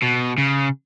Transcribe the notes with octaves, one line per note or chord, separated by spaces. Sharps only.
B2
C#3